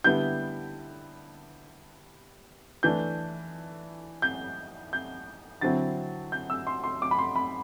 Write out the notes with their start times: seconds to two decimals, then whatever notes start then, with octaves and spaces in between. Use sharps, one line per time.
0.04 D3 G3 B3 E4 G6
2.83 E3 A3 D4 G6
4.22 G6
4.93 G6
5.61 D3 F#3 C4 E4 A6
6.32 G6
6.50 E6
6.67 C6
6.84 C6
7.02 D6
7.11 B5
7.19 C6
7.36 B5